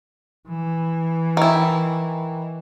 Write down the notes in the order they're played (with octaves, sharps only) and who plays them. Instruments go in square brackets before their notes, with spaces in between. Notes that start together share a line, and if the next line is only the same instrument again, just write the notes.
[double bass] E3
[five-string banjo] D#3 E4